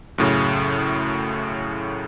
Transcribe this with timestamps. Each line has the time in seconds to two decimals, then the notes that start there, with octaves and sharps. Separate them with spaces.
0.18 F#2 A2 C#3